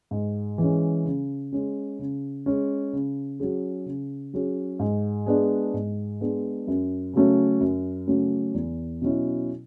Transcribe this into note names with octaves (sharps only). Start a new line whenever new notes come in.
G#2
E3 G#3 C#4
C#3
G#3 C#4
C#3
G#3 C#4
C#3
F#3 C#4 G#4
C#3
F#3 C#4 G#4
G#2
G#3 B3 D4 G#4
G#2
G#3 B3 D4 G#4
F#2
C#3 F#3 A3 C#4
F#2
C#3 F#3 A3 C#4
E2
B2 F#3 C#4 E4